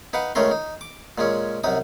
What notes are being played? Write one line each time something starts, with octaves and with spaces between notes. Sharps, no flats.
D#4 B4 F5 F#5
C#2 C#3 A3 C#4 A#4 C6
D#4
D6
A#2 G#3 C#4
C2 F#2 D#4 D#6